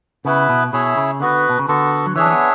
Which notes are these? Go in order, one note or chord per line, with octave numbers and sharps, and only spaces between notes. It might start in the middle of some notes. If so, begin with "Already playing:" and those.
C#3 B3 E4 B4
B2
B2 E4 G#4 C#5 E5
C#3
D3 B3 F#4 B4
B2
C#3
D3 B3 F#4 A4
F#3
E3 D4 G#4 C#5 E5
C#4
B3